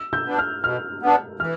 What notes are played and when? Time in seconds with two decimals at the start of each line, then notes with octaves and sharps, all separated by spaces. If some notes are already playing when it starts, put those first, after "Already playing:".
Already playing: E6
0.13 G6
0.25 B3 D4
0.38 F6
0.64 B2 F6
1.03 B3 D4
1.40 E3 F6